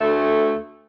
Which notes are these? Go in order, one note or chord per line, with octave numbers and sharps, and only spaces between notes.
D2 A3